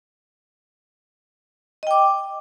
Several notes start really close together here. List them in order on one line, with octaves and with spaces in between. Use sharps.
D#5 G5 D6